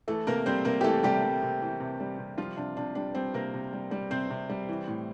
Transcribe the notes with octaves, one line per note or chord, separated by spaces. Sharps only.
E3 A3 A4
C3 A#3 A#4
G3 C4 C5
C3 A#3 A#4
G4
E3 A3 A4
C3 G3 G4
G3
C3
E3
C3
G3
C3
F3 G3 F4
C3 D4
C3 D4
G3 D4
G3 C4
C3 A#3 A#4
C3
G3
G3
C3 C4 C5
C3
G3
E3
A2